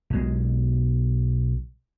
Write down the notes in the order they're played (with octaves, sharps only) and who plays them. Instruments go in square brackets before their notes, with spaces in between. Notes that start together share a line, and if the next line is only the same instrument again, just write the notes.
[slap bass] B1 B2 G#3